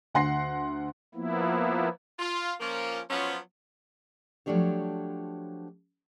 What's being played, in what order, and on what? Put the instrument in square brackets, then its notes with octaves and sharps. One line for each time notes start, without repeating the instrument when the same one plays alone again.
[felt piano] D2 F#5 C6 A#6 C7
[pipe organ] F3 A#3 B3 E4
[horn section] F4
F3 A#3 C#4
F3 F#3 B3 C#4 F4 C5
[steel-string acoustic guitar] F3 F#3 A3 D4 G4 C#5